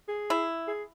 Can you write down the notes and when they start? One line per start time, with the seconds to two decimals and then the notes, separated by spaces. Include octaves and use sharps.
0.09 G#4
0.30 E4
0.68 G#4